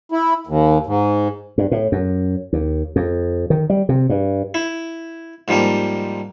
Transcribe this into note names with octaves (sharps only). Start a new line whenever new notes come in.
E4
D#2
G#2
G2
A2
F#2
D#2
F2
D#3
G3
C3
G2
E4
G#2 F3 G3 A#3